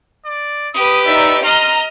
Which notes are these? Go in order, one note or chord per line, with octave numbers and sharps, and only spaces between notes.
D5
G4 B4 D#6
D#4 D5 E5
D#5 A#5 C6 F6